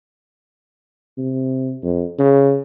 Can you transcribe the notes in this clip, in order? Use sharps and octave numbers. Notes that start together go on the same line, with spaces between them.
C3
F2
C#3